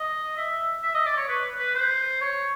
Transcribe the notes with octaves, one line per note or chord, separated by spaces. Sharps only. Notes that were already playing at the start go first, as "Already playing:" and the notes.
Already playing: D#5
E5
E5
D#5
D5
C#5
B4
B4
C5
C#5